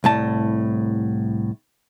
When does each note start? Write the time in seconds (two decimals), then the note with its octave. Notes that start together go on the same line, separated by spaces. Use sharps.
0.04 C2 A2 A5